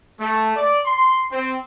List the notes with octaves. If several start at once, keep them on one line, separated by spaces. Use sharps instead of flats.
A3
D5
C6
C4